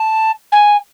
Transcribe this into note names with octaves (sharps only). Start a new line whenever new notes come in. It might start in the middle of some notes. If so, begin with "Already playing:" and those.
Already playing: A5
G#5